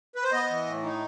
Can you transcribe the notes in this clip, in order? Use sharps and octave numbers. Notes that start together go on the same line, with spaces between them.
B4
C5
B3 D#5
E3
A2
D#4